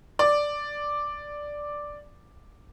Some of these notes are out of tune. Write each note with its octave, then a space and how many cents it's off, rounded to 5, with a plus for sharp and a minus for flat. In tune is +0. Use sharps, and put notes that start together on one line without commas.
D5 +0